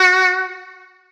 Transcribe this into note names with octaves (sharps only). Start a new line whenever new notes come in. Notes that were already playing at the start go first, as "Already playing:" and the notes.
Already playing: F#4